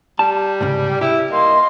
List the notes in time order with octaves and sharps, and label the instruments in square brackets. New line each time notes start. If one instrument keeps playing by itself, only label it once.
[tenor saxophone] G3 [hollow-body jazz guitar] A5
[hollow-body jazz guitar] C2 G#2 C#3
[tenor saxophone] E4 [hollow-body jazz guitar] G4
[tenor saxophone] A#3 [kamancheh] D#5 C6